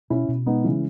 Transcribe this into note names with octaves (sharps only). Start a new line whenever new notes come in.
B2 C#4 E4
B2
G#3 B3 D#4
C#3 E3 C#4